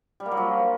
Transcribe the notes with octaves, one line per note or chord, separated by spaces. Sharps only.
G3
A#3
F#3
F3